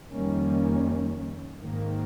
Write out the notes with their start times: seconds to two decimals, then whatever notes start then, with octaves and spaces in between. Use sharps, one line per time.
0.12 F2 D#3 G3 A#3 C#4
1.60 G#2 D#3 A#3